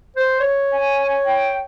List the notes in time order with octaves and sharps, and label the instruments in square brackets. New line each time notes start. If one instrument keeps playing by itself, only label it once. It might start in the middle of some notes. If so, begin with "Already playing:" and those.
[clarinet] C5
C#5
[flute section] G#5
G5